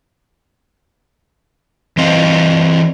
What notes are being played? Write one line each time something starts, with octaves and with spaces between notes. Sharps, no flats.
E3 C4 D#5 F5